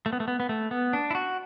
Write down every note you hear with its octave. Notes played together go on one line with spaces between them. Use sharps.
A3
B3
A3
B3
B3
A3
B3
D4
E4
F#4